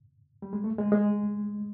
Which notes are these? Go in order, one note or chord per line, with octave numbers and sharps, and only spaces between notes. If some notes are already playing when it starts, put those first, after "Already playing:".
G3
G#3
A3
G#3
G#3